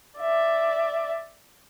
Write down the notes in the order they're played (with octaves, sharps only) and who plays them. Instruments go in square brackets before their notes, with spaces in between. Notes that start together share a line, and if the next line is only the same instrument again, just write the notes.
[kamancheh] D5 E5